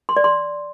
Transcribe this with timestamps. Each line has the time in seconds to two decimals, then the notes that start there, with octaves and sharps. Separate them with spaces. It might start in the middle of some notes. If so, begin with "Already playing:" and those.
0.09 C6
0.17 D5
0.24 C6